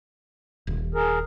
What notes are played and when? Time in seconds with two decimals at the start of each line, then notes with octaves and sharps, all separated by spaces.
0.67 D#1
0.95 G#4 A#4